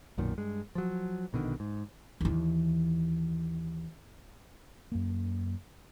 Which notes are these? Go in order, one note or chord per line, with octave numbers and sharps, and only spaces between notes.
B1 F#2 A#2 D#3
G2 G#3
F3 F#3
A#1 B2 D3 D#3
G#2
D#2 E3
F#2 A#3